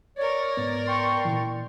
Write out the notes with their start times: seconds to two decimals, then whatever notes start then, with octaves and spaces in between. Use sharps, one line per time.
0.17 A#4 C#5 D5
0.57 G#2 B3
0.87 G5 C6 C#6
1.25 A#2 E3